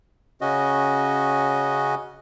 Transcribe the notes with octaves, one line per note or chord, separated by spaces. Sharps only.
C#3 C#4 F#4 D#5